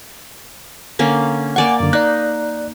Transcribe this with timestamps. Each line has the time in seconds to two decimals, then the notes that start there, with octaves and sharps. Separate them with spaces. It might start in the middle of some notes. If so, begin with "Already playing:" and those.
0.99 D3 A#3 C#4
1.56 A#3 D5 F#5 G#5 C#6
1.80 F#2 D3
1.93 D#4 D5 F#6